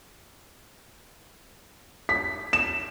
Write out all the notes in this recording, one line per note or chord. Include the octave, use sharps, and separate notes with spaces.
B6
E7